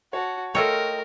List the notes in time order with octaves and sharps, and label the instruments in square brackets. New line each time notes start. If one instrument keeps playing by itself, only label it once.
[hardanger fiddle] F#4 [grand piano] C#5 A5
[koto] A3 F4 C#5 [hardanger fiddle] A#4 [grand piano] D#5 G5 E6